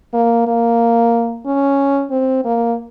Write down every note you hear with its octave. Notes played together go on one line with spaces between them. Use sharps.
A#3
A#3
C#4
C4
A#3